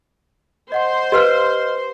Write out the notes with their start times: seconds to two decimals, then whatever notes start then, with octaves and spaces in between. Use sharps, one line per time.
0.72 C5 D#5 F#5 C6
1.12 G4 B4 D#5 F5 F6